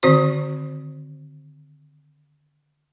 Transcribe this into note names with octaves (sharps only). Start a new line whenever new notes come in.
D3 D#3 C4 F#4 C5 C#6